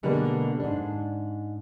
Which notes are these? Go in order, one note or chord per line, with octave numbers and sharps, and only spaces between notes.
B2 D3 G3 G#3 A#3 B4
G#2 D4